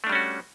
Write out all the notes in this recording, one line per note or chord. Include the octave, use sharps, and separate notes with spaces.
G3 A3 C#4 D4 F#4